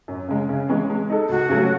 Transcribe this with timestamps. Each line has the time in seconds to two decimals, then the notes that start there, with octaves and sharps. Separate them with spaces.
0.08 F#2
0.28 C#3 G#3
0.49 C#3
0.69 E3 G#3 C#4
0.90 G#3
1.10 D#4 A4
1.29 C#2 F#4
1.49 C#3 F#3 A3